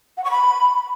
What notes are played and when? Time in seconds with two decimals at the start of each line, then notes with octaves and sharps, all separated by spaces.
0.17 F#5
0.24 C#6
0.31 B5